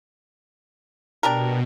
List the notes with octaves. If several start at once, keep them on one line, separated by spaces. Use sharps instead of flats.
B2 D4 G4 A#4